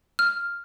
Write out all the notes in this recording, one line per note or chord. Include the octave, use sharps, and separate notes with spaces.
F6